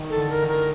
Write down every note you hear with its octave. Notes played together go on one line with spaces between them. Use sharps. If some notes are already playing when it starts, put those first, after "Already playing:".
Already playing: D#3
A4
D3
A#4
D#3
A#4